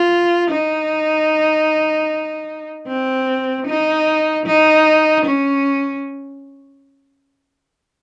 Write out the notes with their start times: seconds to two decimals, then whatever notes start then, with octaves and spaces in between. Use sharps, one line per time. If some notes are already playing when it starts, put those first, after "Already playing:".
Already playing: F4
0.50 D#4
2.87 C4
3.67 D#4
4.46 D#4
5.26 C#4